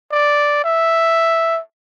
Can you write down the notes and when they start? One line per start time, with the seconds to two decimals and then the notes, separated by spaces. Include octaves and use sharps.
0.11 D5
0.64 E5